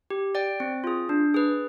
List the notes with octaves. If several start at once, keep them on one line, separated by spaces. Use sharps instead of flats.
G4
D5 G5
C4
F4 G#4
D4
G#4 B4